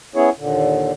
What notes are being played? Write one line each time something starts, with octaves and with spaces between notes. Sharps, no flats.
B3 C#4 E4 G#4 C#5
D#2 A#2 D3